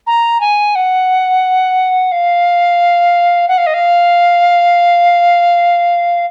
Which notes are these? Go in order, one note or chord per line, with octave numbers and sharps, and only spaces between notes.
A#5
G#5
F#5
F5
F#5
F5
D#5
F5